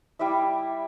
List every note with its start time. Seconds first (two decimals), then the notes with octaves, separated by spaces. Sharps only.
0.19 G3 E4 D5 E5